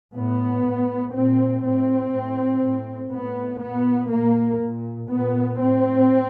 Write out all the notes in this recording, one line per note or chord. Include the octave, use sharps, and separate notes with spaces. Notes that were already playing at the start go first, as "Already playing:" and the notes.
A2 B3
A2
A#2 C4
A2 C4
A2
A2
A2 B3
A#2 B3
A#2 A#3
A#2
A#2 B3
A2 C4